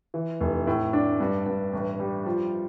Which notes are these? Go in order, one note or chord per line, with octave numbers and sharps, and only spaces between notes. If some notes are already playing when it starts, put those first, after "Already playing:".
E3
F1
A2
D4
G2
G2
A1
G3
F3